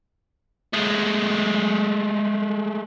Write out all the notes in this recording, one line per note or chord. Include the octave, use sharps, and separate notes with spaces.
G#3 A3